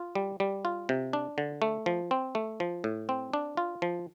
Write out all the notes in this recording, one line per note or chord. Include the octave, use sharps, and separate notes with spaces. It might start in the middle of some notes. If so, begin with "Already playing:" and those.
Already playing: F4
G3
G3
F4
C3
D4
D3
A3
F3
C4
A3
F3
A2
C4
D4
F4
F3